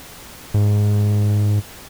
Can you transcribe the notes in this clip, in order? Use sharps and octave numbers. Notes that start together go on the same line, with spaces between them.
G#2